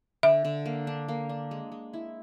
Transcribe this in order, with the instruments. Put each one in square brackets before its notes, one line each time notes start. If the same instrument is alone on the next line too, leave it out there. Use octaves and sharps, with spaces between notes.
[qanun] D3 [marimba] E5
[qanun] D3
A#3
D4
A#3
D4
G#3
G#3
E4